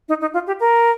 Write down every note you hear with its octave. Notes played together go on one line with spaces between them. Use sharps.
D#4
D#4
F4
G4
A#4